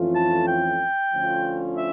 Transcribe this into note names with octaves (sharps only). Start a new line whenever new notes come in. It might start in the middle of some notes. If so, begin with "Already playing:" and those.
Already playing: F2 E3 A3 C#4 F4
A5
G5
D2 D3 F3 C#4 F4
E5